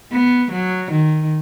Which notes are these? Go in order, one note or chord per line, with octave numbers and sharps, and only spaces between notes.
B3
F#3
D#3